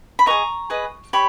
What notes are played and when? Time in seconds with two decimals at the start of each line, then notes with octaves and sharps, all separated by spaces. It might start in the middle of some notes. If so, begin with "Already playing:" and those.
0.19 B5
0.26 G#4 B4 D#5 A#5 C#6
0.70 G#4 B4 D#5
1.13 G4 C#5 B5